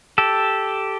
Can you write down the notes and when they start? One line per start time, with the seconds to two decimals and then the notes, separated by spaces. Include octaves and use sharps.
0.18 G4 A4